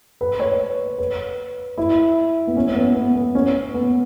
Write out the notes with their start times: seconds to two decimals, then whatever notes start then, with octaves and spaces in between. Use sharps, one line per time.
0.21 B4
0.40 C#5
0.98 B4
1.78 E4
2.47 B3
2.56 C#4
2.68 C#4
2.75 B3
2.95 B3
3.15 B3
3.35 C#4
3.74 B3